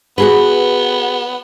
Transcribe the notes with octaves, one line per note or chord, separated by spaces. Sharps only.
B3 F#4 G#4 B4